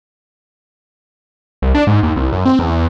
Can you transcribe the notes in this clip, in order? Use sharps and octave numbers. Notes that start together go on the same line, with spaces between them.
C2
D4
G#2
D#2
C2
F#2
C4
E2
E2